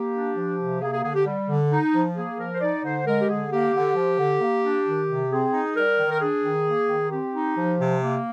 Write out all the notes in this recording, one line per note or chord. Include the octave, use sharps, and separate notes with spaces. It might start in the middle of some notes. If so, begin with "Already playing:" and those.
Already playing: A#3 G4
D4
F3
C3
A#3 G#4
G#4
D3 G#4
G4
G3
D3
D#4
F3
A#3 G#4
F3 A#4
C5
D#4 D5
D3 C5
G#3 A#4
G4
D3 G#4
A#3 G4
D3
F3
D3
A#3
D4
D#3
C3
C4 G#4
D#4
G3 A#4
D#3
A#4
D4 G#4
D#3
A#3
D#3
C4 G4
D#4
F3
C3
A#3